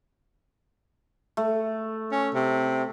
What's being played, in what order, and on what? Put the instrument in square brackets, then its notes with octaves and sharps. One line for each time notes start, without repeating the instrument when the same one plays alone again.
[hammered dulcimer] A3
[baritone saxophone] C#4
C3